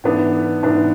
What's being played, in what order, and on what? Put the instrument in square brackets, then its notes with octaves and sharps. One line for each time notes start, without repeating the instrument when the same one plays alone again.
[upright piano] G#2 E3 B3 D4
G#2 E3 B3 D4